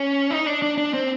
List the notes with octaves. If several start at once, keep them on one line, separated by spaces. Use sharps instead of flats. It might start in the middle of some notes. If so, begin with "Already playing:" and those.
Already playing: C#4
D#4
D4
D4
D4
C4